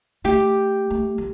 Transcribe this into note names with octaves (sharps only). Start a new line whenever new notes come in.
A3 G4
A3
F3